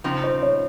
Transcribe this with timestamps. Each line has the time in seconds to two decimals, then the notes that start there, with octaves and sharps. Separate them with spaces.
0.04 C#3 F3 C4 D#4
0.24 C5
0.43 C#5